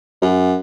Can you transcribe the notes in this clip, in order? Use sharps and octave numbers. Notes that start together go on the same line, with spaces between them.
F#2